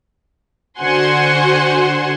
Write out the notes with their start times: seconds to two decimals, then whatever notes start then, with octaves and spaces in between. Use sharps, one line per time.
0.80 D3 F#4 C5 F#5 G#5 C6